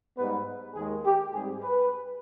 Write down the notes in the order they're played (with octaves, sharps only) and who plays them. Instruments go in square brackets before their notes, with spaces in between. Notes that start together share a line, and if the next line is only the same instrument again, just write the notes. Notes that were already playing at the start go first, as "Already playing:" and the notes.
[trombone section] G#2 G3 B3 B4
D#2 D#3 G#3 G#4
G4
G#2 G3 C4 G#4
B4